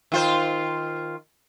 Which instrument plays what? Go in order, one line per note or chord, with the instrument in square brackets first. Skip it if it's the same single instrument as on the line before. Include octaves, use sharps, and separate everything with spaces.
[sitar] D#3 F4 C5